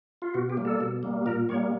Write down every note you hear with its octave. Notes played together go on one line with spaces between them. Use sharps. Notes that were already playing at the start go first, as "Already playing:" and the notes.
F4
B2 F#4
G4
G3 A#3
A4
B2
G3 A#3
A#2 A#4
G3 A#3 C#5